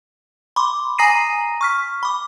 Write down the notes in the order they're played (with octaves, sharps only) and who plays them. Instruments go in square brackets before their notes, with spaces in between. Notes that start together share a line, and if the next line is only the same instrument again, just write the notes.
[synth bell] B5 C6 D6
G#5 A#5 D#6 A#6 C7 D#7
C#6 F6 B6
B5 D6